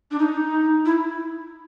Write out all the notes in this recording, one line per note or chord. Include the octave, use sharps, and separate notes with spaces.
D4
D#4
E4